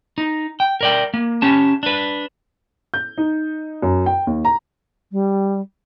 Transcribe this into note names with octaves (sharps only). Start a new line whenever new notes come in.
D#4
G5
A#4 D5 G5
A#3
C#4 G4 A5
D4 B4
G6
D#4
F#2
G5
D#2
A#5
G3